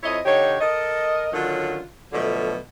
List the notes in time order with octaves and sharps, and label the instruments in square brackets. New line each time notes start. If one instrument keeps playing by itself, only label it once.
[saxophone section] F2 E4 C#5 D#5
D3 D#4 G4 C#5
A4 A#4 D#5
D3 D#3 F#3 C#4 F4
B2 D3 F3 F#3 A3